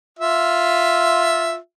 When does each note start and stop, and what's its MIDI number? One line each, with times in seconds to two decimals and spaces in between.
0.19 1.57 65
0.19 1.57 76